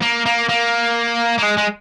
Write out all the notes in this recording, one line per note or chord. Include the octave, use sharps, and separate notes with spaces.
A#3
A#3
A#3
A#3
G#3
G#3